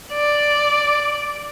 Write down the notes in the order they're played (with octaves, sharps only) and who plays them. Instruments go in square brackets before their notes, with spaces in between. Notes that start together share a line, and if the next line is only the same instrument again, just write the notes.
[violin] D5